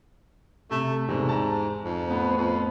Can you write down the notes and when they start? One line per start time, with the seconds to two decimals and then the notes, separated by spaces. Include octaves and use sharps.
0.71 C3 A3
1.08 E2 G#2 C3
1.29 A5 A#5
1.84 F2
2.08 A2 B3
2.37 F2